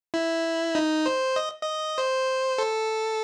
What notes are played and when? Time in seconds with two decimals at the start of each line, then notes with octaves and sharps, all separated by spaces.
0.14 E4
0.75 D#4
1.06 C5
1.36 D#5
1.62 D#5
1.98 C5
2.58 A4